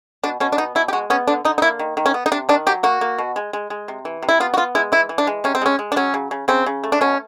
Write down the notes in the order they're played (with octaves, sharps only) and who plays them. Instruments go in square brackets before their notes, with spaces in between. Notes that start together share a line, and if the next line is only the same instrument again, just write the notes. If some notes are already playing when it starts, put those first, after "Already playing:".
[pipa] B2 D4
B2 C#4
D4
B3 D#4
B2 E4
G4
G#3 F#4
B3 C#4
D3 D4
D3 D#4
D#4
A#3 E4
D#3
D#3
C#4
B3
D#4
C3 D4
D#3 D4
F#3 G4
A#3 F#4
A#3
B2
G#3
G#3
G#3
C3
E3
C3
E4
B3 F4
F#4
B3 F4
G#3 E4
E3 E4
E3
D4
G#3
C3 C#4
C4
G#3 C#4
G#3
D4
F#3 C#4
C#3
C#3
C#3 C4
C#3
A3
D4
B2 C#4